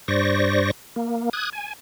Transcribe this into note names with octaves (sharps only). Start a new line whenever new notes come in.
G2 C5 D5 C#6 A#6
A#3
D#6 F#6 G#6
G#5